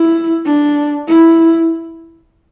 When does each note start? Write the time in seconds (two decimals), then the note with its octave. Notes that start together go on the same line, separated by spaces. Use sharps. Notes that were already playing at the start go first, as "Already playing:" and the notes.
Already playing: E4
0.46 D4
1.08 E4